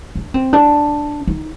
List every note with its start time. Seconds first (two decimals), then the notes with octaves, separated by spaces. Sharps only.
0.15 D4
0.34 C4
0.53 D4
1.27 D#4